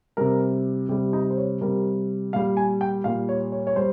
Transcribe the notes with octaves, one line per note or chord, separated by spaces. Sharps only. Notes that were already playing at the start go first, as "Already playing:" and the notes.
C3 G3 A#4
C3 G3 G4
D#4
C5
C#5
C3 G3 A#4
A#2 G3 F5
G#5
G5
A#2 G3 F5
C#5
C#5
C#5
G3 C5